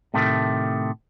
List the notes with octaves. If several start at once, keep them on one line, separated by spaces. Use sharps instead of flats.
A2 C3 D#3 A3